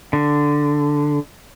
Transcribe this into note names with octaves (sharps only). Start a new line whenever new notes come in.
D3